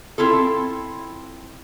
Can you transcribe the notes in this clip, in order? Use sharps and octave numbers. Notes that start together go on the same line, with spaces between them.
C4 E4 F4 A4